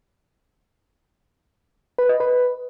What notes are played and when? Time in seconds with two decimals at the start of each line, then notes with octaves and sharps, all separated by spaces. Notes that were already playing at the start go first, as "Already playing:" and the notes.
1.98 B4
2.09 D#5
2.20 B4